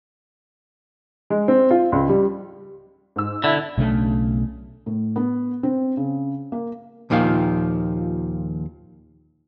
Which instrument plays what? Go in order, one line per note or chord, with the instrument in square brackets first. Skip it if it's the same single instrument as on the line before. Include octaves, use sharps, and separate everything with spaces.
[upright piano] G#3
C4
F4
C#2
G3
[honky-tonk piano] G#2 E6
[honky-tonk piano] B1 [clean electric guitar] D3 [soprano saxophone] E4
[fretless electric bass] B1 C#3 A3 D4
[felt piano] A2
B3
C4
C#3
A#3
[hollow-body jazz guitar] D#2 A#2 D#3 F3 F5